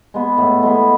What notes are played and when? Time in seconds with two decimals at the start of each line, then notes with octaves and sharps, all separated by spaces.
0.14 G#3 B3
0.38 A2
0.63 G#3 B3